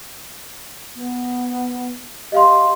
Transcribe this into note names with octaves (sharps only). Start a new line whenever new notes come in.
B3
G4 D#5 F5 C6